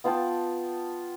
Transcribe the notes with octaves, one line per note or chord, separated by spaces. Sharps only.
B3 F4 G5 A5